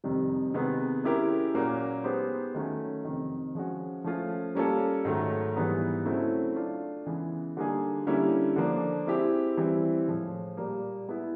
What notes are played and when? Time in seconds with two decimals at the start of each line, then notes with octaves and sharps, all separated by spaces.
0.04 F2 C3 D#3 G3
0.54 C3 D#3 G#3 B3
1.04 G#3 C#4 E4 G4 A#4
1.54 A#2 F#3 A#3 C#4
2.04 G#3 B3 D#4 G4 C5
2.54 D#3 F#3 A3 C#4
3.05 F2 C3 D#3
3.55 F3 G#3 C#4 F#4
4.04 F3 A3 C#4 F4
4.55 G3 A#3 C#4 F4 A4
5.05 G#2 D#3 F#3 A3
5.56 G#2 E3 G3 B3 D#4
6.05 C#3 F#3 A3 C4 E4
6.56 A3 D4 F4
7.06 C#3 E3 G#3 B3
7.57 D3 G3 A#3 D#4 G#4
8.07 D3 G3 A#3 C#4 E4
8.56 D3 F3 A#3 D4
9.07 G#3 C4 E4 G4
9.57 E3 G3 C4 E4
10.08 A2 F3 G#3
10.57 A#2 G3 A#3
11.07 G#3 B3 E4